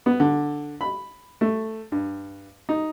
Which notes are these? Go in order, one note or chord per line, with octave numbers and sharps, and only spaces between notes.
B3
D3
B5
A3
G2
D#4